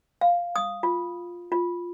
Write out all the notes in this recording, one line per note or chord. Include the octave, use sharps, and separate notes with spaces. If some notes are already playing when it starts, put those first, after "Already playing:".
F5
D#6
F4
F4